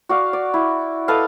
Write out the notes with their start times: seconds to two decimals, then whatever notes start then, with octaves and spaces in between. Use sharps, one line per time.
0.09 F#4 D5 F5
0.33 D5
0.54 E4
1.08 A4 B4 D#5 F5